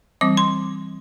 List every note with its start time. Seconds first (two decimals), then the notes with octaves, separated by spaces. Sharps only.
0.21 E3 G3 C4 D6
0.37 C6